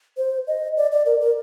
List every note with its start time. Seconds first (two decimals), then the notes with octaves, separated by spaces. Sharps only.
0.17 C5
0.47 D#5
0.77 D5
0.92 D5
1.06 A#4
1.20 A#4